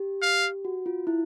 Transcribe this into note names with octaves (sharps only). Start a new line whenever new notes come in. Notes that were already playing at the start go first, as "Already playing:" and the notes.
Already playing: G4
F5
F#4
F4
E4